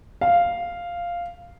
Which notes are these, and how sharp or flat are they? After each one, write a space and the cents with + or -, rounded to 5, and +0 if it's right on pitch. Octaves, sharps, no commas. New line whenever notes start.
F5 -5